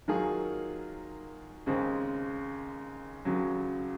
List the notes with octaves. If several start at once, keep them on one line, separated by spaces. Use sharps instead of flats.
D#3 F#3 A#3 F4 G#4
D#2 C#3 G#3 C4
D#2 C#3 F#3